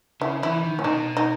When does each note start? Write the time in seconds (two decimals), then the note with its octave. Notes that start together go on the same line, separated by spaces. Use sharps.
0.21 C#3 E4
0.42 E3 E4
0.64 D#3
0.78 A2 C#4
0.84 B2 D#4
1.17 D#4